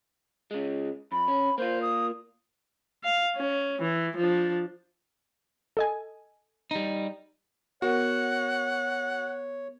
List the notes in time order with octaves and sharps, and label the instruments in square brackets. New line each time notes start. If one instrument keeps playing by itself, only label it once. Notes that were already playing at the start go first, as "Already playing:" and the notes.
[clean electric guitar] C#3 G#3
[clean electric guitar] F2 [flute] B5
[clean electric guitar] C#4
[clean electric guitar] A#3 F4 [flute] C5
[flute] D#6
[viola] F5
C#4
E3
F3 D4
[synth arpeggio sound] A4 D#5 G#5
[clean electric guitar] G3 D#4
[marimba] B3 A#4 [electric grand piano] F#4 [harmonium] C#5 [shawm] F#5